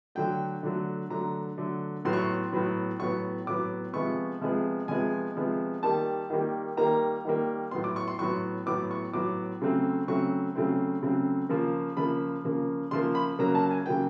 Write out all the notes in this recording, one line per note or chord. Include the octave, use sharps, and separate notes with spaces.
D3 F#3 A3 G5
D3 F#3 A3
D3 F#3 A3 A#5
D3 F#3 A3
A2 F#3 B3 C6
C#6
C6
A2 F#3 B3
A2 F#3 B3 C#6
A2 F#3 B3 D6
C3 F3 G#3 B3 C#6
C3 F3 G#3 B3
C3 F3 G#3 B3 G#5
C3 F3 G#3 B3
D#3 G3 A#3 A5
D#3 G3 A#3
D#3 G3 A#3 A#5
D#3 G3 A#3
A2 F#3 B3 C6
D6
C#6
C6
A2 F#3 B3 C#6
A2 F#3 B3 D6
C#6
A2 F#3 B3 D6
C#3 F#3 A3 C4
C#3 F#3 A3 C4 C#6
C#3 F#3 A3 C4
C#3 F#3 A3 C4
C#3 F3 A#3
C#3 F3 A#3 B5
C#3 F3 A#3
C#3 F3 A#3 C6
B5
C#3 F#3 A#3 A#5
A5
G#5
C#3 F#3 A#3 G5